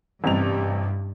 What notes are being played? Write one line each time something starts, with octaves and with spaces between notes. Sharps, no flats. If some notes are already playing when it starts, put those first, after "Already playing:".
A1 G2 C3 F7